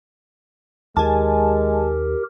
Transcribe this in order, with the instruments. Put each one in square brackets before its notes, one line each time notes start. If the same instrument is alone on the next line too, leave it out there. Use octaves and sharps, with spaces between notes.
[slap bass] D#2 [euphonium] G#3 [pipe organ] G4 A#4 [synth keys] G#5 A5